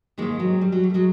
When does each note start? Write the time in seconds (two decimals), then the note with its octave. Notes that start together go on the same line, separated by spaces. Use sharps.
0.18 G#2 D#3 G#3 A#3
0.39 F#3 G#3
0.61 G3
0.72 F#3
0.83 G3
0.90 A3
0.94 F#3 G#3